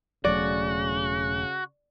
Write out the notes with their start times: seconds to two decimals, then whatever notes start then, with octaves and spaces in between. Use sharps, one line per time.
0.24 E1 C#3 F#3 A3 F#4 D5